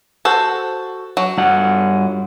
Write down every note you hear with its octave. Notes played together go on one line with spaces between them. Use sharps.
F#4 A4 C5
F#3
G2 F#5